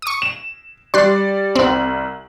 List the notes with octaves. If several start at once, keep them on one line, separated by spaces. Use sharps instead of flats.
C#6 D#6
E7
G3 D5 C6 F#6
C2 C4 F#7